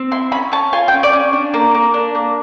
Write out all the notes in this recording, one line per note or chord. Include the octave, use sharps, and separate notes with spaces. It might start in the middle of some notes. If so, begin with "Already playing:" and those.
Already playing: C4
E4 C6
C#4 B5
C#4 A5
F4 G#5
G5
C#4
D5
C#4
D4
A#3
A#3
D4
A#3